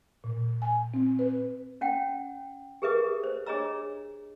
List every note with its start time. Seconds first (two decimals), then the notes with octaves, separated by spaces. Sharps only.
0.24 A#2
0.62 G#5
0.94 C4
1.19 B4
1.81 C#4 F#5 G5
2.82 G4 G#4 A#4 B4 E5 D#6
3.23 C5
3.46 D4 G#4 C#5 D#5 A#5 E6